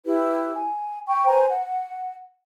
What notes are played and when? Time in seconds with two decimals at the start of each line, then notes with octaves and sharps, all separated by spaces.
0.05 E4 G4 B4
0.54 G#5
1.07 G5 C#6
1.26 B4 C5 G#5 A#5
1.49 F#5